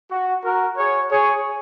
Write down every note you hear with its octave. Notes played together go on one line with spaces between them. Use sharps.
F#4
F#4 A#4
G#4 C#5
G#4 C#5